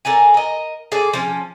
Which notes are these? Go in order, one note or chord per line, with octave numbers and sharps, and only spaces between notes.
A4 A#4 D5 G#5
A#4 D#5
G#4 A4 D5
F3 C#4